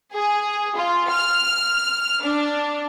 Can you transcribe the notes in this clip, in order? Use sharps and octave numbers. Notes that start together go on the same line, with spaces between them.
G#4
F4
F6
D4